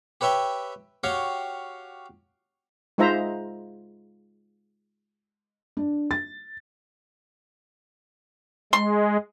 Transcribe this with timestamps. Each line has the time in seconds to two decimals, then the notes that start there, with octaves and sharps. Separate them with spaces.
0.21 G4 B4 C#5 E5 G5
1.04 F#4 G4 C#5 F5 G5
2.98 G#3 D#4 F4 C5 E5 A#5
5.77 D4
6.11 A6
8.73 G#3 C6